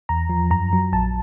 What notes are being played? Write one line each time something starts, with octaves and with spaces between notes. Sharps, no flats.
E2 A#5
F3
F#2 A#5
F#3
A#1 A5